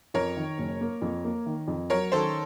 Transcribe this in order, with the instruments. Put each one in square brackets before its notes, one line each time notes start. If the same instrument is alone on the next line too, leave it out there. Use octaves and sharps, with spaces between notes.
[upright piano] F2 [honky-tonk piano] A#4 C#5
[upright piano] D#3
F#1
A#3
F2
A#3
D#3
F2
[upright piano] F#3 [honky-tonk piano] A#4 C#5
[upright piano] D#3 [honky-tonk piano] A4 C5